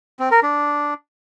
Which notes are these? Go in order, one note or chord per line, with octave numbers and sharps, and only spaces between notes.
C4
A#4
D4